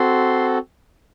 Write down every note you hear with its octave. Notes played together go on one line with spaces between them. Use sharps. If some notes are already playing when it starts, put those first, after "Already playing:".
Already playing: C4 F#4 A4 C6